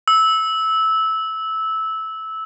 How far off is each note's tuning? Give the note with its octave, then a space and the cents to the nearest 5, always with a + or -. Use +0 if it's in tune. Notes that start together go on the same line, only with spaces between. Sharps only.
E6 -15